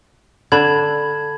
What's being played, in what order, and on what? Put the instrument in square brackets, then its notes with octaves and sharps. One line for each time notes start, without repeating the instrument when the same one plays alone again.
[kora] D3 [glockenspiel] A5 B5 G#6